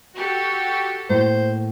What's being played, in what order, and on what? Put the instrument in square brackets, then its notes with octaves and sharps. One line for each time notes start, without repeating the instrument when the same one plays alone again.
[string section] F#4 G4 A4
[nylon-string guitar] A2 A#3 [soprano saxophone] C5